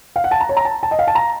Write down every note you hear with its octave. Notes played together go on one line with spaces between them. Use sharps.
F5
F#5
A5
A#5
C#5
A#5
A5
A5
D#5
F5
A5
A#5